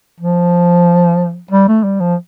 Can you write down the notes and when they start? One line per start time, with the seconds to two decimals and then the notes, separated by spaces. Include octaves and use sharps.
0.20 F3
1.51 G3
1.68 A3
1.84 G3
2.00 F3